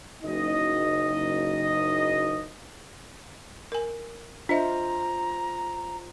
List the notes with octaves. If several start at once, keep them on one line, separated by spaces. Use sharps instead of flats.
F#1 D#4 D#5
A#4 G#5
D4 F4 C5 D#5 E5 A#5